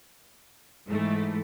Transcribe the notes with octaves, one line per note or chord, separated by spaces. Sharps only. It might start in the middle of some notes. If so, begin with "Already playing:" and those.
G#2 E3 A3